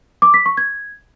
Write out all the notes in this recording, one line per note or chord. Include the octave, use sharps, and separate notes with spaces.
D6
B6
C#6
G#6